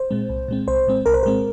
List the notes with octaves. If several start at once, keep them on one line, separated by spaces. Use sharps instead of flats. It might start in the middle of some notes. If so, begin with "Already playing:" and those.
Already playing: C5
A#2 G#3 C4
C2
A#2 G#3 C4
C2 C5
A#2 G#3 C4
C2 A#4
C5
A#2 G#3 C4 A#4